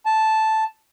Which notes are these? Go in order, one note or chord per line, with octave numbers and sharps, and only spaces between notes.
A5